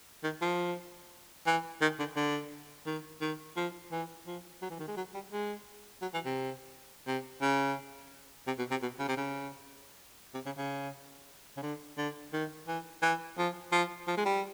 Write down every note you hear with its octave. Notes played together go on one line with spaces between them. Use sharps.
D#3
F3
E3
D#3
D3
D3
D#3
D#3
F3
E3
F3
F#3
E3
D#3
G#3
F#3
G3
G#3
F#3
E3
C3
C3
C#3
C3
B2
C3
B2
C#3
C3
C#3
C3
C#3
C#3
C#3
D3
D3
D#3
E3
E3
F3
F3
F3
G#3
G3